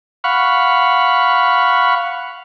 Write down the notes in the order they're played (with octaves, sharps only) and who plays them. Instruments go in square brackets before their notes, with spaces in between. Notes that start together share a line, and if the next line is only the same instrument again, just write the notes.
[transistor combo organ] F5 F#5 B5 C#6